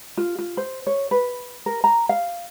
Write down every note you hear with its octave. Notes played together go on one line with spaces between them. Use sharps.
F4
F4
C5
C#5
B4
A#4
A#5
F5